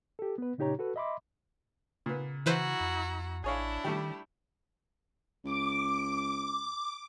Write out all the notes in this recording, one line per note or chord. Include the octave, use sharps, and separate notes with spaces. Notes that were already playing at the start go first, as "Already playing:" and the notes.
G4 A4
B3 B4
A#2 C#3 D#4 G4 C#5 A#5
F#4 A4 B4
D#5 E5 B5 C6 D6
A#2 C#3 B3
E3 E4 F#4 B4 C5 A#5
F2
A1 D4 E4 G#4 C#5 F5
D#3 G3 A3 G4
C#2 D6